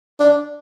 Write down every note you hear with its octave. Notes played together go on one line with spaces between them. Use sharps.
D4